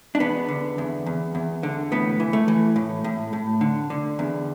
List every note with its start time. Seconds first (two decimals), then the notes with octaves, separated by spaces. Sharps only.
0.15 D4
0.20 E2 B3
0.49 D3
0.78 E2
1.06 E2
1.35 E2
1.63 D3
1.92 A2 B3
2.20 E3
2.33 A3
2.48 E3
2.76 A2
3.04 A2
3.33 A2
3.61 D3
3.90 D3
4.19 E2